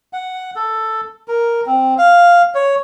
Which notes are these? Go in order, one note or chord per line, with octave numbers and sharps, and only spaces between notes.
F#5
A4
A#4
C4
F5
C#5